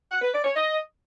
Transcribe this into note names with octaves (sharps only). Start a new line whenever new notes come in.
F#5
B4
D5
C#5
D#5